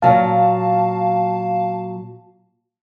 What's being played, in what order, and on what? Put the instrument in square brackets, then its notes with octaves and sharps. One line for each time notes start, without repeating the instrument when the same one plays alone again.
[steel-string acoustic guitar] A#2 F#3 [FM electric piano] F5 A5